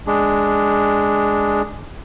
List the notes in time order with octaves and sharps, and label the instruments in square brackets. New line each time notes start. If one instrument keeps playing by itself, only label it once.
[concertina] G#3 D4